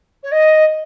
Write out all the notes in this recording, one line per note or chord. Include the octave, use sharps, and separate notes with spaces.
C#5
D#5